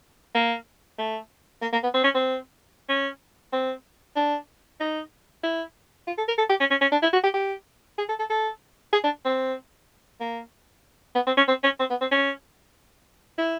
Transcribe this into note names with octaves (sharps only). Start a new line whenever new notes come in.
A#3
A3
A#3
A#3
B3
C4
C#4
C4
C#4
C4
D4
D#4
E4
F4
A4
A#4
A4
G4
C#4
C#4
C#4
D4
E4
F#4
G4
G4
G#4
A4
A4
A4
G#4
D4
C4
A#3
B3
C4
C#4
C4
C#4
C4
B3
C4
C#4
E4